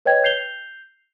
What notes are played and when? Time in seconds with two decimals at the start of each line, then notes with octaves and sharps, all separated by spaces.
0.06 B4 C#5 D#5 G5 G#6
0.24 G6 C7 F7 G7